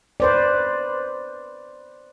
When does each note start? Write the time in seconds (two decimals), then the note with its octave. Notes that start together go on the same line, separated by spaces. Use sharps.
0.20 B4 C5 D5